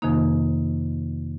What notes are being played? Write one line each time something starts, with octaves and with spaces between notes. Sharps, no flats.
F2 C3 D#3 A#3 D#4